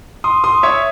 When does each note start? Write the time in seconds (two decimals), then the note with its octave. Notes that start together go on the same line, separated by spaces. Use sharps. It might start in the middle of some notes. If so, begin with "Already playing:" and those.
0.24 C6 D#6
0.44 C6 D#6
0.63 C#5 E5